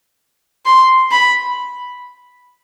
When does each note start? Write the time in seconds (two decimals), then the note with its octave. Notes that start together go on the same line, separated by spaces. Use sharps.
0.66 C6
1.11 B5